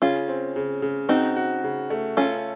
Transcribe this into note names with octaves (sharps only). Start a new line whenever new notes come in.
C#3 C#4 F4
C4
C#3
C#3
C4 D#4 F#4
F#4
C#3
A3
C#4 F4 A4